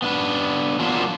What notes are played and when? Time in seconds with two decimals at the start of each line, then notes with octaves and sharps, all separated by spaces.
0.02 B3 D4 B4
0.79 F3 F#3 A#3 B3 D4 F4